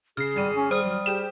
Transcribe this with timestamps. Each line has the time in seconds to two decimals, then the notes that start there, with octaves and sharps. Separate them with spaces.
0.17 C#3 G#4 F6 C7
0.36 G#1 G3 D#7
0.55 C#4
0.71 G3 C5 D#6 F6
0.84 F#3
1.06 G4 G#4 E7